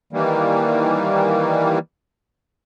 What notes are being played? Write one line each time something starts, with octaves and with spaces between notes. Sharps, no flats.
D#3 E3 G3 A#3